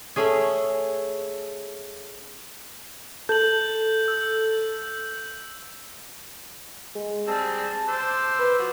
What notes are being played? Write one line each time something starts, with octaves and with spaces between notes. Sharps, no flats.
A3 C#4 G#4
A4 G6 F#7
E6
G#3
G3 C4 G#4 A5
C5 D6 E6
B4
F3 F#4